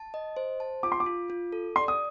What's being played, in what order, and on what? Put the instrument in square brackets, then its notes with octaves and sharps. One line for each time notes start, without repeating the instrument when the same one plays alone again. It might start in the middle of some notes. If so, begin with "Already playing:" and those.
Already playing: [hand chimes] A5
D#5
C5
A5
[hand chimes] F4 [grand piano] D6
[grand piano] C6
D6
[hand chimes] F4
F4
A4
[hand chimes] D5 [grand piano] C6
[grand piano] D#6